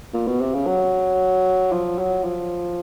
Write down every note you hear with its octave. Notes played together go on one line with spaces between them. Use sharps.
A#2
B2
C3
C#3
F#3
F3
F#3
F3